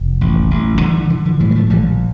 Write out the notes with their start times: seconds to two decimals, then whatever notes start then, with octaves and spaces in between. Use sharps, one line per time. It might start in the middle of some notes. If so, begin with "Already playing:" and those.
Already playing: F1
0.21 A1
0.51 A1
0.75 F3
0.81 D3 E3 G3
0.96 E3
1.10 D3 E3
1.25 D3 F3
1.40 A2 E3 G3
1.50 G3
1.55 F3 A3
1.70 A#1 E3 G3